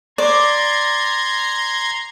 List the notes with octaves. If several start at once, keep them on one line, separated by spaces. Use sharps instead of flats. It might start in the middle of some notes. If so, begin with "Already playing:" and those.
D5 A#5 C6 G#6